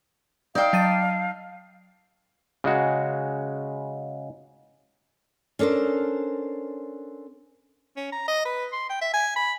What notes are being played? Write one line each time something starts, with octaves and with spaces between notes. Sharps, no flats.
D#4 D5 F5 G5 E6
F#3 A5 A6 D#7
C#3 G#3 F#4
C#4 D4 A4 A#4 C5
C#4
A#5
D#5
B4
C6
G5
E5
G#5
B5